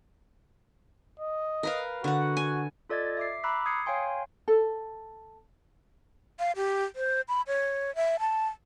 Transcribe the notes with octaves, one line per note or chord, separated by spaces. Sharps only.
D#5
A#4 B4 F5
D3 F#4 F#5
G#5
F4 A4 D5 D#5 G#6 A6
E5 D6 C7
A#5 B5 D6 E6 F#6 B6
D#6 G#6 C7 C#7
C#5 F5 G5 G#5 C6
A4
F5
G4
C5
B5
C#5
E5
A5